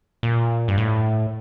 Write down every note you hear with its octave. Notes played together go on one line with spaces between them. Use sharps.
A#2
G2
A2